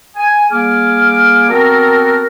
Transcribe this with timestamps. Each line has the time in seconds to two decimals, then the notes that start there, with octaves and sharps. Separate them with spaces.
0.16 G#5
0.51 G3 A#3 G#4 G#5 D6 F6
1.49 B3 C4 F#4 A4 A#4